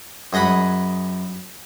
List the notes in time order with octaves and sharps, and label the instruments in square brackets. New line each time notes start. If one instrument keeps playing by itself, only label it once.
[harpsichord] F#2 G#4 D#5 F#5 B5